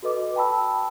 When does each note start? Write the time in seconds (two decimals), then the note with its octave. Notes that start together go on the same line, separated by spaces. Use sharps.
0.03 F#4 A4 B4 D#5 D6
0.36 G5 A5 B5 E6